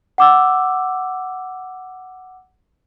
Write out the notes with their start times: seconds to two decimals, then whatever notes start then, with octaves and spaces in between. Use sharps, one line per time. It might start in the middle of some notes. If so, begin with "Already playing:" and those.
0.18 F#5 D6 E6